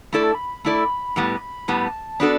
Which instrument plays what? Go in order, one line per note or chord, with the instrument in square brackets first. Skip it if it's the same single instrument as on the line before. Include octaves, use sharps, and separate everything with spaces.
[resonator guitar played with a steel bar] A3 E4 A4 D5 [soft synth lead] B5
[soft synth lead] A5
B5
[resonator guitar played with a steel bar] A3 E4 A4 D5 [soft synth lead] B5
[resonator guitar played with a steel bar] A2 G3 B3
[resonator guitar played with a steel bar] A2 G3 B3 [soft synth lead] A5
[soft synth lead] B5
A5
[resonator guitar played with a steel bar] B3 D4 F#4 A4 [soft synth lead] D5